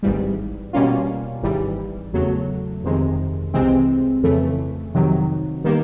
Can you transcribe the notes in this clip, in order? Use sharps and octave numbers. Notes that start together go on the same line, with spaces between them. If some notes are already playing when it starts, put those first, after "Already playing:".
G#1 G#2 E3 G3
B2 G3 A#3 C#4 F4
G#1 G#2 E3 G3
E2 C#3 F#3 A3
G1 F2 C3 D#3 G#3
C2 C3 E3 G#3 C4
F2 C#3 E3 A3
F2 C3 D#3 F#3
D#3 G3 A#3